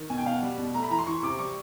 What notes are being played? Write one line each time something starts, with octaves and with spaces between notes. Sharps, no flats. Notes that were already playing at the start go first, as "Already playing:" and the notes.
Already playing: D#3
B2 G#5
G5
B2 F5
F#5
G3
B2
A3 A#5
B5
E3 A#5
C6
E3 C#6
C3 D6
G3 C#6